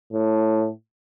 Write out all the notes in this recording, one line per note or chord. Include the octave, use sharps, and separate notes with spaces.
A2